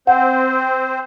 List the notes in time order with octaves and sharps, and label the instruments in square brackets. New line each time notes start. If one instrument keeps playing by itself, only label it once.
[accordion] C4 C5 [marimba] F#5